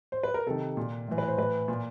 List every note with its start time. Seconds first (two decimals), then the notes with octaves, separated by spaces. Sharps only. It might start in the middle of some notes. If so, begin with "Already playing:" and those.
0.12 C5
0.23 B4
0.34 A#4
0.46 C3 D#3 A4
0.77 A#2
1.08 A2 E3
1.18 B4
1.28 C5
1.37 A2 E3 B4
1.68 A#2